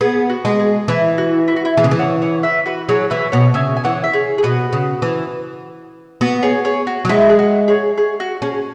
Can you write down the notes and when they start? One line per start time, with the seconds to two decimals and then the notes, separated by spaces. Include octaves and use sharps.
0.01 B3 G#4
0.30 F#4
0.45 G#3
0.59 G#4
0.88 E3 E4
1.18 F#4
1.48 E4
1.56 F#4
1.65 E4
1.77 E3 G#4
1.84 C#3
1.91 E3
1.99 C#5 F#5
2.22 C#5 F#5
2.43 B4 E5
2.66 F#4 B4
2.88 F#3 G#4 C#5
3.10 E3 B4 E5
3.32 B2 C#5 F#5
3.54 C#3 E5 G#5
3.77 G#5
3.84 E3 C#5 F#5
4.04 E5
4.13 G#4 C#5
4.38 G#4
4.43 B2 F#4 B4
4.73 C#3
5.02 E3
6.21 B3 F#4
6.43 G#4 C#5
6.65 G#4 C#5
6.87 F#4
7.05 F#3
7.09 G#3 E4
7.29 G#4
7.39 F#4
7.68 G#4 C#5
7.98 G#4
8.20 F#4
8.42 C#4 G#4